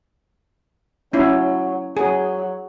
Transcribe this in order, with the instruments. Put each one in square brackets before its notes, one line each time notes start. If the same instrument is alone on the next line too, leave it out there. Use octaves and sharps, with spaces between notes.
[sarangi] F#3 [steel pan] C#4 E4
[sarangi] F#3 [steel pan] G#4